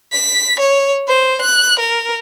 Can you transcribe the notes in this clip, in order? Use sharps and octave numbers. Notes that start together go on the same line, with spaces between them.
B6
C#5
C5
F#6
A#4